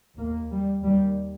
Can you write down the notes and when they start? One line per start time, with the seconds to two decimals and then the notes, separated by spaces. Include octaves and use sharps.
0.18 D#2 A#3
0.52 G3
0.84 D#2 G3